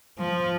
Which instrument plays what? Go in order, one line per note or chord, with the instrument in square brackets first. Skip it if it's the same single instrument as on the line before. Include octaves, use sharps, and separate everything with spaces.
[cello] F3